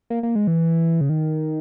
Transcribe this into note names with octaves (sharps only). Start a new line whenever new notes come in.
A#3
A#3
G#3
E3
C#3
D#3